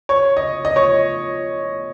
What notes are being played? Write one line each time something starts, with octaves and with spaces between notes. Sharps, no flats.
C#5
D#5
D#5
C#5